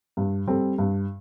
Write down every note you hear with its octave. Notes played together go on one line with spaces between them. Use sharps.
G2
G3 C4 A4
G2